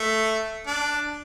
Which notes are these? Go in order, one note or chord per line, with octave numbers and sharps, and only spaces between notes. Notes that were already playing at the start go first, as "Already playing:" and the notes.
Already playing: A3
D4